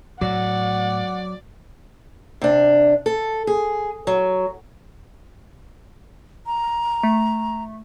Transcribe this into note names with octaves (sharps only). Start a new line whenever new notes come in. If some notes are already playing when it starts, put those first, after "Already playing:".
A2 F#3 D5 F#5
C3 D4
A4
G#4
F#3
A#5
A3